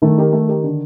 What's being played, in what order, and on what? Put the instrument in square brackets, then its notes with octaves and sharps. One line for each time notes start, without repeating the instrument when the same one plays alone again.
[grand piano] D#3 [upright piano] A3
[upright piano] D#4 G4 A#4
A3
D#4 G4 A#4
D3